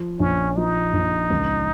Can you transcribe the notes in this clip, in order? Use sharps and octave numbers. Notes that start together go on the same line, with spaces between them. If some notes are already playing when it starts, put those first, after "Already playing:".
Already playing: F3
A#1 C#4
F3 D#4
A#1
C#2